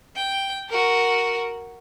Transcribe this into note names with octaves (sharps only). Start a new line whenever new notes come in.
G5
F#4 A#4